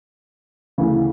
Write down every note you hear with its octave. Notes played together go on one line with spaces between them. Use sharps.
D2 C#3 E3